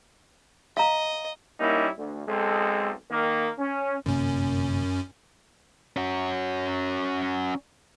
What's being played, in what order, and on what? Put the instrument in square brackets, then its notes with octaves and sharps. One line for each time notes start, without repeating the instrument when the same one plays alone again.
[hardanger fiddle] D#5 [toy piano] F5 A#5
[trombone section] G3 A#3 C#4 D#4 E4
D2
B1 G#3 C4 A4
D#3 A#3
C#4
[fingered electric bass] G1 C3 A#3 [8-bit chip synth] F#2 C#4
[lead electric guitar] C#4 F#4